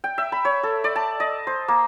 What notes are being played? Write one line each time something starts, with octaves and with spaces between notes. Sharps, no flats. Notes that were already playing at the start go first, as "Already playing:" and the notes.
G5
E5
B5
C#5
A4
D5
A5
D#5
C5
A#3